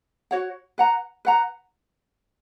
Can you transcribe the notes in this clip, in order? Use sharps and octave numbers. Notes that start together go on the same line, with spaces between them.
F#4 C#5 F#5
B4 F#5 A#5
B4 F#5 A#5